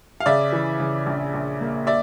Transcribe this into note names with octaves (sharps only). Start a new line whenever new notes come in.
F5
C#3 D5 E5
E3
C#3
A#1
A#1
A#3
D5 E5